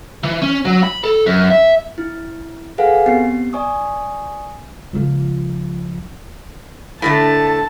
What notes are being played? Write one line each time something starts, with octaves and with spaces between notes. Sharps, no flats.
E3
C#4
F#3
B5
A4
F#2
E5
E4
G#4 A4 B4 F5 F#5 G#5
B3 C4 G4 C7
D5 G#5 C#6 D#6
C#2 F3
A2 D3 A3 A5